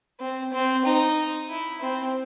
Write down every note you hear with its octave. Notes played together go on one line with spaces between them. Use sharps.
C4
C4
D#4
E4
C4